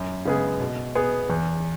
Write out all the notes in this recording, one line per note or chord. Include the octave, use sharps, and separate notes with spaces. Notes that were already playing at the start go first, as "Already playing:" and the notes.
Already playing: F#2
C#3 G#3 B3 G#4
B2
B3 G#4
E2